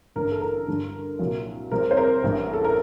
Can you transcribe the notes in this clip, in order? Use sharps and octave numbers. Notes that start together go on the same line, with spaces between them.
A1 G2 D3 A#4
A4
A#4
G2 D3 G3
C2 A#2 F#3 A#3
C2 C3 G3 C4 A#4
C5
A#4
A1 A2 G3 D4
A4
A#4